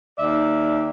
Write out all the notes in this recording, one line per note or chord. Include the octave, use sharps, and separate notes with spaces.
D#2 D5 E5